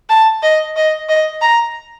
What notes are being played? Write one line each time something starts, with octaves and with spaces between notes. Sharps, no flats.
A5
D#5
D#5
D#5
A#5